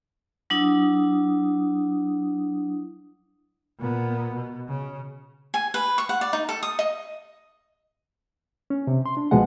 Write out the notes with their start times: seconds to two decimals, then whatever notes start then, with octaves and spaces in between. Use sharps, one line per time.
0.50 F#3 D4 E4 D#6
3.79 A#2 B3
4.34 B2
4.68 C#3
5.54 G#5
5.74 B4
5.98 C#6
6.09 F#5
6.21 D5
6.33 D#4
6.49 A4
6.63 D#6
6.79 D#5
8.70 C#4
8.87 C3
9.06 C6
9.17 D4
9.31 C#2 B2 F3 G#3 F#5